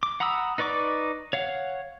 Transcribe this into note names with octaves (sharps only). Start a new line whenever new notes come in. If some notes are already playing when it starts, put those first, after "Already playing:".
D6
F#5 A#5 B5 D#6 E6
D#4 B4 D5 C#6 D6
C#5 F5 F#5